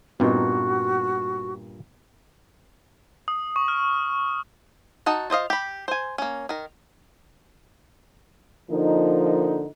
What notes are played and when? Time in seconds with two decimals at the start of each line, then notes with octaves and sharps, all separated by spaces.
0.20 G2 A#2 B3 C4 D#4 F#4
3.28 D#6
3.56 C#6
3.68 F6
5.06 D#4 F#4 A5
5.30 F4 C5 D#5 F5
5.50 G4 B5
5.88 C5 G#5
6.18 A#3 C#4
6.49 D#3 A#4
8.71 D3 F3 A#3 D#4